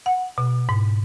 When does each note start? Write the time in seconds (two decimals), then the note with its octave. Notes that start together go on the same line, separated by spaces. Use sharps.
0.06 F#5
0.38 B2
0.69 G#2